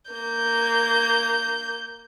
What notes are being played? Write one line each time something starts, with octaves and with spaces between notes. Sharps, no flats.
A#3 G6